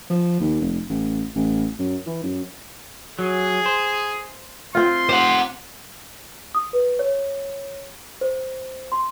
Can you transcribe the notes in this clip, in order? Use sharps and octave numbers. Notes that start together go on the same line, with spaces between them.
F3
D#2
F1
A1
A1
F#2
E3
F#2
F#3 G#4
C5
C4 F4 C6
G4 C5 F#5
D#6
B4
C#5
C5
C6